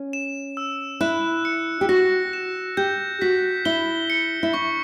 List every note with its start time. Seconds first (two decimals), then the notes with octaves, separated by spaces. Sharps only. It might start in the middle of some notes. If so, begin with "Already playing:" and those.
Already playing: C#4
0.13 E7
0.57 E6
1.01 E4 F#6
1.45 C#7
1.81 G4
1.89 F#4 A#6
2.33 E7
2.77 G4 G6
3.21 F#4 B6
3.65 E4 G7
4.10 C#7
4.43 E4
4.53 D4 C#6